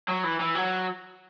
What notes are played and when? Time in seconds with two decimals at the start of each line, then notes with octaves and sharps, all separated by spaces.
0.09 F#3
0.24 E3
0.40 E3
0.55 F#3